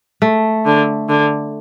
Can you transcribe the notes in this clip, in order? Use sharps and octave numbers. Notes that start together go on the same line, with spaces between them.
A3
D3
D3